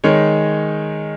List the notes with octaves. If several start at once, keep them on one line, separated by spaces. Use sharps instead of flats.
D#3 G#3 D#4 C#5